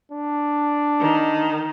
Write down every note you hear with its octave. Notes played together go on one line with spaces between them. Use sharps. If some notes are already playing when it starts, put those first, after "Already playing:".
D4
D#3